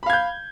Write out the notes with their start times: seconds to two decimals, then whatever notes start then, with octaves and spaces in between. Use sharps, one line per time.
0.03 B5
0.06 F5
0.10 G#6
0.13 G6